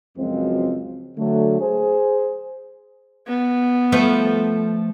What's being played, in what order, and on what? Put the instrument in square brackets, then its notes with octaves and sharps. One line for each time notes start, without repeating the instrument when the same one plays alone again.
[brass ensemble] C#2 F#2 F3 F#3 G#3 C4
D3 F#3 A3
G#4 C5
[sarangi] B3
[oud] F3 A3 B4